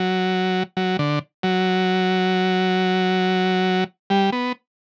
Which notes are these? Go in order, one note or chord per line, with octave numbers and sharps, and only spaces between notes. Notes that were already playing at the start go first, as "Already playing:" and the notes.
Already playing: F#3
F#3
D3
F#3
G3
B3